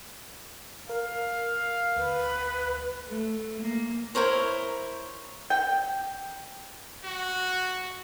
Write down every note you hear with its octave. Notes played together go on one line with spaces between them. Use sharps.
A#4 F5
D2 B4
A3
A#3
E4 A#4 C5 C#5
G5
F#4